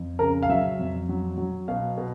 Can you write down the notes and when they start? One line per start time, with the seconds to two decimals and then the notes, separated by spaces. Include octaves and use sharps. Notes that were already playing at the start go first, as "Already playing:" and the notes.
Already playing: F2
0.19 C#3 A#4
0.43 F5
0.49 F#3 E5
0.79 F2
1.09 F#3
1.38 F#3
1.68 B2 F5
1.98 B2